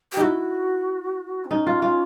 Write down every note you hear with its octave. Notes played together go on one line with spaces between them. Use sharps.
G4
D#4 E4 F#4
C4
C#4 D#4
F4
F4